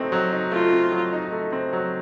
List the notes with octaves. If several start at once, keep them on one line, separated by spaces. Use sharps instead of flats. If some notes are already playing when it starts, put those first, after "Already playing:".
Already playing: F#3 A3 C4 D#4
F#3
D#4
A3 F4
C4
F#3
D#4
A3
C4
F#3